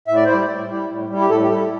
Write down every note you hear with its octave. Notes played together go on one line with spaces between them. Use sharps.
A2 E5
D5
C5
G3 E4 D5
A2
G3 E4
A2
G3 E4
G4
A2 A4
G4
G3 E4 A4